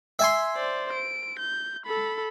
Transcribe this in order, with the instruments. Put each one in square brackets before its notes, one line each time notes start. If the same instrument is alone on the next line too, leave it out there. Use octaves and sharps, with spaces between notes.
[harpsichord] E5 G#5 C6
[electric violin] C5 D5
D7
G6
A4 B5